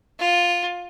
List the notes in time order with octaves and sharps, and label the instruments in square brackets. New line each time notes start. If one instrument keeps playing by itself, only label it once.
[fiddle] F4